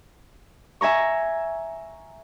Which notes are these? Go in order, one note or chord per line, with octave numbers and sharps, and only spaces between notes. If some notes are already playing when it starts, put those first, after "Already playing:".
E5 G#5 A#5 C#6